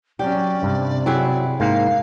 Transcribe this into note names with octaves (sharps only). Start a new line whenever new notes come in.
F#3 C#4 G4 D5
G2 C3
F#3 E4 G4 G#4
G#2 A#3 F5